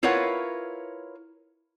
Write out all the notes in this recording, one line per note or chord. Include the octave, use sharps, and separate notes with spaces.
E4 F4 A#4 B4 C#5 F#5